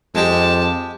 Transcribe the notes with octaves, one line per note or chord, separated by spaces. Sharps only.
F2 G#3 G4 A5